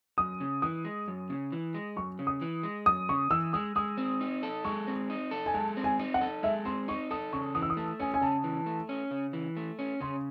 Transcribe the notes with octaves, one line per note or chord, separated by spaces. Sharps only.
F#2 D#6
C#3
E3 D#6
G#3
F#2
C#3
E3
G#3
F#2 C#6
C#3
D#6
E3
G#3
F#2 D#6
C#3 C#6
E3 E6
G#3 D#6
G#3 D#6
C4
D#4
A4
G#3 C#6
C4
D#4
A4
G#5
G#3 A5
C4
G#5
D#4
F#5
A4
G#3 E5
C4 C6
D#4 C#6
A4 D#6
C#3 C#6
E3 D#6
E6
D#6
A3 A5
C#4 G#5
G#5
C#3 A5
E3
A3
C#4
C#3
E3
A3
C#4
C#3 C6